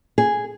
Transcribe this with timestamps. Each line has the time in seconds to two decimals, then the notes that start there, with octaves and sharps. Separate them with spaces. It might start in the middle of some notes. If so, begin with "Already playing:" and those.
0.18 G#4